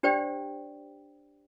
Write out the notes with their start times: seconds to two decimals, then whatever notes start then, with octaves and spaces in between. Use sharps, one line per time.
0.03 D4 G4 C5 D5 G5